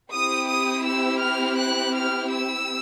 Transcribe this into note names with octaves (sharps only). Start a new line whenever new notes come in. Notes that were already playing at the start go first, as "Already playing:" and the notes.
C4 E4 G4 D#6
D#6
E6
F6
F#6
F6
E6